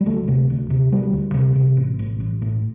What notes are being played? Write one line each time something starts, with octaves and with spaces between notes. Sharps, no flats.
G3
D2 A3
C3
D2
C3
D2 G3
D2
C3
C3
A1
A1
A1
A2